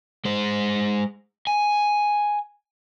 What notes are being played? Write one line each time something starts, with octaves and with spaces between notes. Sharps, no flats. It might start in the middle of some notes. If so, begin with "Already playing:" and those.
G#3 C5
G#5